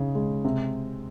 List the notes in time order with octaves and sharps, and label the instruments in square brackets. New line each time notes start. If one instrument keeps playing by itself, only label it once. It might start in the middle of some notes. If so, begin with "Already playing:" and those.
Already playing: [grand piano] C#3 D#4
G#3
C3